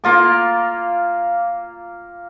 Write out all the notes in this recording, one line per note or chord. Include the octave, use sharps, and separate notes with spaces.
A#3 F4 D6